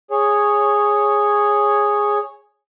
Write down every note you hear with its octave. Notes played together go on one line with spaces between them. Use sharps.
G#4 C#5